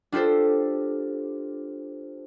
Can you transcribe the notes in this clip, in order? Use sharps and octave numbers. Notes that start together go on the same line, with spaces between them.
D4 F4 G4 A4 C5